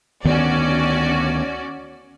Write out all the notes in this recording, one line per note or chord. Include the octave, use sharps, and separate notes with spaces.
D2 D#3 B3 C#4 F#4 D5